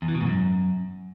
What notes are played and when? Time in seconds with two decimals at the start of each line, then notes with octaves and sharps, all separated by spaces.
0.02 E2
0.08 E3
0.14 B2
0.21 G#2
0.27 F#2